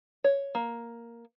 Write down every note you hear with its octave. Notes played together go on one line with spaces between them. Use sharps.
C#5
A#3